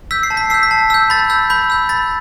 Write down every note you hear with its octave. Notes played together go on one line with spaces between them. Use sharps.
E6 G6 B6
C7
A5
B6
E6 G6 C7
B6
A5
E6 G6
B5 A6
E6 G6
B5 G6
E6 G6
B5 A6